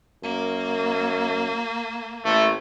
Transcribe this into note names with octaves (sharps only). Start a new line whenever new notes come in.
F#2 A#3
A1 A3